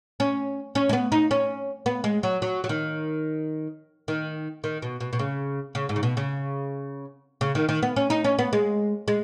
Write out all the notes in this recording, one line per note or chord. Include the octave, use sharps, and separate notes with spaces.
C#4
C#4
G#3
B3
D#4
C#4
B3
G#3
F#3
F#3
F#3
D#3
D#3
D#3
B2
B2
B2
C#3
C#3
G#2
C#3
B2
C#3
C#3
D#3
D#3
B3
C#4
D#4
C#4
B3
G#3
G#3